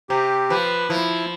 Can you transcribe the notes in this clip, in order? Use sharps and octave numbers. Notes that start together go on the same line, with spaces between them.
C3 G4
F3 B4
F3 E4